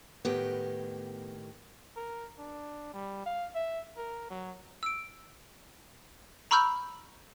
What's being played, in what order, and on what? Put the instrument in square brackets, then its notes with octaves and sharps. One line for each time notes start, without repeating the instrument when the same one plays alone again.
[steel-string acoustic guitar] A2 D#3 G4 [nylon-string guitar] B3
[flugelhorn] A#4
D4
G3
F5
E5
A#4
F#3
[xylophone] E6 D7
A#5 B5 C#6 E6 F6 G6